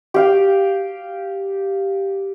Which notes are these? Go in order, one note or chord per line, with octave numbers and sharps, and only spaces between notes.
G4 F5 G5